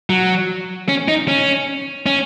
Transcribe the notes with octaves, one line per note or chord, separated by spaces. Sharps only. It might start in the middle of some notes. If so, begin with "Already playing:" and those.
F#3
C#4
D#4
C#4
C#4